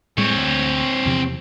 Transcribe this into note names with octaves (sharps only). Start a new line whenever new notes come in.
A2 G3 G#3 C4 C#5
D2
E2 C3 F3